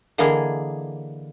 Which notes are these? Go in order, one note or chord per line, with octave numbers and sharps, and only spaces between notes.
D3 E3 A#3 G#4 D#5 G#5